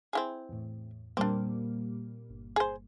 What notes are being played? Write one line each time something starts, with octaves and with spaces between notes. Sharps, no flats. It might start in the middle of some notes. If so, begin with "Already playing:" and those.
C4 E4 G#4
E2 A2
A#2 G3 A#3 C4 D4
G1
G#4 C5